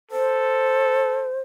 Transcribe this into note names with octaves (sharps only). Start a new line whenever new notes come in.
A4 C5